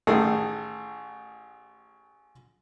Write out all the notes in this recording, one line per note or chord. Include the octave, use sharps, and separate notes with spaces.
A1 A2 D#3 G#4 A4